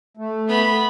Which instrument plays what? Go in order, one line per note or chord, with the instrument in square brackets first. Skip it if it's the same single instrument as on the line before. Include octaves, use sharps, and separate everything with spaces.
[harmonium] A3
[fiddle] B3 B5